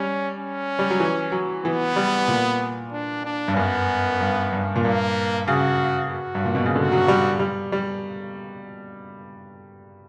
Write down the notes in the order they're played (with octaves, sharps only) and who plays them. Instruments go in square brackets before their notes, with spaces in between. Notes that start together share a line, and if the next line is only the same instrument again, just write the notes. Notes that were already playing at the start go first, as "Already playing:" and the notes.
Already playing: [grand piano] G3 [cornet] C#4
[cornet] C#4
[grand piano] G3
F#3
E3
F#3
[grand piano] E3 [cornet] B3
[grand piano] G3
A#2
[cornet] D4
D4
[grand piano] G2
[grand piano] F#2 [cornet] B3
[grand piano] G2
G2
A#2
[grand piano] G2 [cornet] A#3
[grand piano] C#3 [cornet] F#4
[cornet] F#4
[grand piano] G2
A#2
B2
C#3
[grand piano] D3 [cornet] F#4
[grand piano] F#3
G3
G3
G3